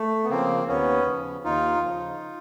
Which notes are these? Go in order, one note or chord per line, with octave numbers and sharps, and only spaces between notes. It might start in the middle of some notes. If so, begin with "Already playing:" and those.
Already playing: A3
B3
C#3 F3 A#3 C4
D#2 B3 C#4
C#3 F3
D#2 D#4 F4
C#3 F3